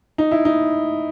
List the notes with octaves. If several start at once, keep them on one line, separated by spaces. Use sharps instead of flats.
D#4
E4
D#4